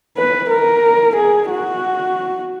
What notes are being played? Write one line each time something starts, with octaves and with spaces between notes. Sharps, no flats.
B4
A#4
G#4
F#4